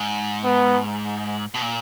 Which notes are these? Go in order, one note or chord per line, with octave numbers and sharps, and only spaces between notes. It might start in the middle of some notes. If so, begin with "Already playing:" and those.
Already playing: G#2
B3
B2
A#2